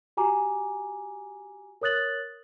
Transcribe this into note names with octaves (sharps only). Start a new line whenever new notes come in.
F#4 G4 G#5 A#5 D6
A#4 C#5 D#6 F#6 A6 F#7